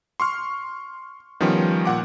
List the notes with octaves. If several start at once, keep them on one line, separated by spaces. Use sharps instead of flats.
C6 C#6 F6
D#3 F3 G3 B3 C#4
A#2 F#5 D6